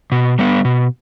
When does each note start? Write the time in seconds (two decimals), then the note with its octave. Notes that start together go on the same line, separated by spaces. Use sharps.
0.12 B2
0.39 G3 B3
0.65 B2